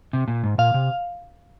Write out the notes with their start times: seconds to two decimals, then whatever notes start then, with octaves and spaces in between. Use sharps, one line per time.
0.13 C3
0.28 A#2
0.43 G#2
0.58 A#2 F5
0.74 C3